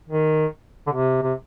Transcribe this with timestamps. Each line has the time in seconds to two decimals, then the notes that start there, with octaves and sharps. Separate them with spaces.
0.09 D#3
0.87 D3
0.91 C3
1.23 C3